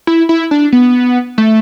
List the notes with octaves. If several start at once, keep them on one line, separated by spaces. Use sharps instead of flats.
E4
E4
D4
B3
A3